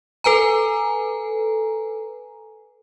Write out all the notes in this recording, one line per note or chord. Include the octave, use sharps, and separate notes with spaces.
A4 B4 G#5 A#5